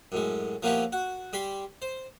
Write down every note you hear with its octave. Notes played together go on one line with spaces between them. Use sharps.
F#2 A2 G#3
F3 A#3 B3 C#4 E4 G4
F#4
G3 G4 B5 C6
C5